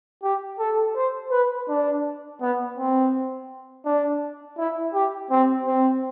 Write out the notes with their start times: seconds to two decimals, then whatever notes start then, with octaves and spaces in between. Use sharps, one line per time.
0.23 G4
0.59 A4
0.96 C5
1.32 B4
1.69 D4
2.41 B3
2.77 C4
3.85 D4
4.58 E4
4.94 G4
5.31 C4
5.66 C4